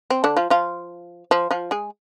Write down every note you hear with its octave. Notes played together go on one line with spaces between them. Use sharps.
C4
D3 D4
F3 F4
F3 F4
F3 F4
F3 F4
G#3 G#4